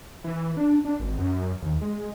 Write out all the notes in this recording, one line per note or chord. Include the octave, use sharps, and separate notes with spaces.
E3
D4
D4
G#1
F#2
D#2
G#3